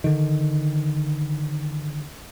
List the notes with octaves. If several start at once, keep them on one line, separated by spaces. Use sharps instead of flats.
D3 D#3